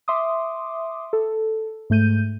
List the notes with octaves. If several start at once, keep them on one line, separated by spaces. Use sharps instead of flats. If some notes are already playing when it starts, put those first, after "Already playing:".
E5 C6 D6 D#6
A4
G#2 A3 G6 D#7